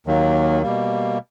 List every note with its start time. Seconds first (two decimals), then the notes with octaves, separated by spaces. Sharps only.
0.07 D#2 D#3 F#3 A#3
0.62 B2 G3 A#3